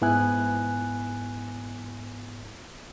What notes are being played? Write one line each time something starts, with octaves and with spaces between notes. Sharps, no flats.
G#2 B3 E4 G#5 F#6